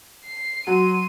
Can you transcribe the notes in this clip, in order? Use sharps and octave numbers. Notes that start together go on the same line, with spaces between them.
C7
F#3 C6 D#7